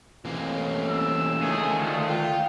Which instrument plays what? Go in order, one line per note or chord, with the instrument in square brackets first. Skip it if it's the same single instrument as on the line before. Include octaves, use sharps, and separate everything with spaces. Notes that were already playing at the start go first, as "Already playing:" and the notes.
[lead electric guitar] E3 A#3 [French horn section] A3 C4 C#4
[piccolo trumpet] E6
[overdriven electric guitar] C#2 G#4 [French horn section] D#3 [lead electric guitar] A3
[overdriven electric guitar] D2 [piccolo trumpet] F4
[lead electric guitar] F4 [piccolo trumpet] G5